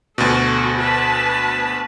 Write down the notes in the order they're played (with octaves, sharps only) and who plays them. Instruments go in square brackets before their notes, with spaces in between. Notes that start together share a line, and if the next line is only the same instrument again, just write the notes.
[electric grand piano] D2 B2 [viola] F#4 A4
[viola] B4 A5